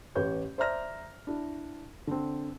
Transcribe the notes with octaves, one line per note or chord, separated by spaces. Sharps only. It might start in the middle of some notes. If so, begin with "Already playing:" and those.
A1 G4 B4 C#5 G6
C5 D5 E5 A#5 F6 A#6
D4 E4
D3 C4